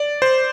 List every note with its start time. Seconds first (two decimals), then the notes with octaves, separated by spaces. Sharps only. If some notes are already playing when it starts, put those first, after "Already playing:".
Already playing: D5
0.22 C5